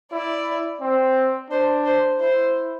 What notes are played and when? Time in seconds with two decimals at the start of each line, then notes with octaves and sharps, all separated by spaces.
0.12 E4 D5
0.81 C4
1.50 D4 C5
1.86 C5
2.20 E4 C5